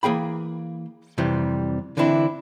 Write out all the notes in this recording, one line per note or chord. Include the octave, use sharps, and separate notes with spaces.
E3 A#3 G#4 G5 B5
F2 C3 E3 G3
D3 E3 C4 D4 E4